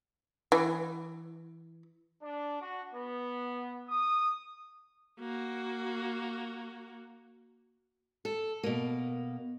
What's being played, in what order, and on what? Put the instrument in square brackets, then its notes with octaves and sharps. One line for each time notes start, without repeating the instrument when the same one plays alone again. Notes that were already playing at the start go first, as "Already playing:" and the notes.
[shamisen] E3
[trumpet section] D4
F#4
B3
D#6
[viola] A#3 F#4
[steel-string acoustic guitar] A4
B2 A#3